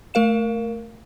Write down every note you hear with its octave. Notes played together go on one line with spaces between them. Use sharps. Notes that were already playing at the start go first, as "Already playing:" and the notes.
A3 A#4 F5 E7